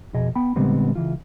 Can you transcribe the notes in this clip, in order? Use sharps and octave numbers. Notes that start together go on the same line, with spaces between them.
F2 B2 G#4 D#5
B3 G5 B5
A#2 D3 G3 G#3 B3 C4
C#2 E3 F4